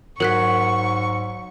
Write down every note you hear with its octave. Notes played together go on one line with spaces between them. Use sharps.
G#2 F#3 A#4 C#6 F#6 B6